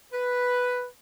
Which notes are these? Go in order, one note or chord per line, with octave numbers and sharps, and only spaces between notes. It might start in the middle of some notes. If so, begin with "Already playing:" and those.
B4